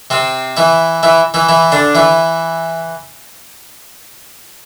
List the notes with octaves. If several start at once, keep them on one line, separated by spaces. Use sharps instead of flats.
C3 C4
E3 E4
E3 E4
E3 E4
E3 E4
D3 D4
E3 E4